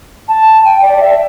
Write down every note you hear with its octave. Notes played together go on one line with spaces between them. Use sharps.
A5
G5
D5
E5